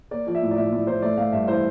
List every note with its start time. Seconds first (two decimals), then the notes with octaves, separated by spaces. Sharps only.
0.11 A#3 D5
0.27 F3 D5
0.35 E5
0.42 A2
0.51 D5
0.57 A2 E5
0.72 A2 D5
0.87 A2 C5
1.02 A3 D5
1.17 A3 F5
1.32 G2 E5
1.48 E3 C5